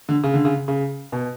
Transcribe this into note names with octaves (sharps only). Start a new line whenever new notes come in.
D3
C#3
D3
C#3
C#3
B2